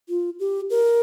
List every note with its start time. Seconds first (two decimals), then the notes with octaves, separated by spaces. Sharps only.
0.09 F4
0.40 G4
0.70 A#4